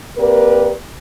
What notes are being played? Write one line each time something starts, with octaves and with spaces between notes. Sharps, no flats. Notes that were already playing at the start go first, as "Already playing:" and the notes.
A#3 C4 G4 A#4 B4 D5